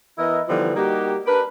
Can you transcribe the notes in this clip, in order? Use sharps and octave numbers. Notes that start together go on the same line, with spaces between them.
E3 B3 E4 A#4 D#5
D3 E3 F3 G3 B3 D#4
G3 A#3 D#4 F#4 G4
D4 G4 A#4 B4